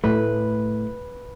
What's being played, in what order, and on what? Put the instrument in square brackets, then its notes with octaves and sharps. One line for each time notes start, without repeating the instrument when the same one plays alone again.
[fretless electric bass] A2 A3 [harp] B4